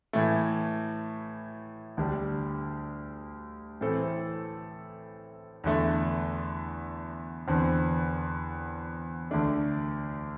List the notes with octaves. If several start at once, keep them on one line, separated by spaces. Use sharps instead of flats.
A2 E3 A3
D2 D3 G3 D4
A2 E3 C4 A4
E2 D3 A3
E2 D3 C4
D2 D3 A3 D4 A4